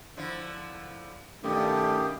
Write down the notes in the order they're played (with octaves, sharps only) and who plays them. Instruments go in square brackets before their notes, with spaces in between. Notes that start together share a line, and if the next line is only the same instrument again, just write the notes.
[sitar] D3 F3 E4
[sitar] G2 B2 [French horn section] D#3 A3 C#4 [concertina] G4